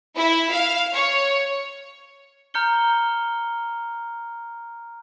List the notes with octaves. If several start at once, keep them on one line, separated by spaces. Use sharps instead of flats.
E4
F5
C#5
A#5 F6 G6 C#7 G7